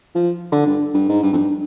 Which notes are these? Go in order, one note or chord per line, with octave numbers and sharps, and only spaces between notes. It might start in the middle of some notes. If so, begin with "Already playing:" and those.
F3
D3
G2
G2
G#2
G2
F2
G2